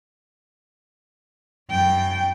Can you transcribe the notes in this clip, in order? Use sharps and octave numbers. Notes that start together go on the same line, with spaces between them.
F#2 G5